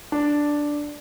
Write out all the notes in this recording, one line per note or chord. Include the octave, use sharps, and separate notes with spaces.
D4